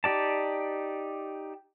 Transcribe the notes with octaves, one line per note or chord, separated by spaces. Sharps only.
D#4 G4 D5 A5